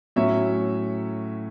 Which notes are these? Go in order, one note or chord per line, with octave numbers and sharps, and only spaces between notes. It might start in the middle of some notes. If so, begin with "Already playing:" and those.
A2 F#3 C#4 E5